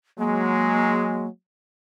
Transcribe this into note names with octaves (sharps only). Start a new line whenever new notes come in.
F#3 G#3 A#3